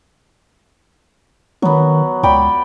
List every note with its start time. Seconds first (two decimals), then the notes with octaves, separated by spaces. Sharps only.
1.62 D#3 F#3 B3
2.23 C#2 D5 G5 B5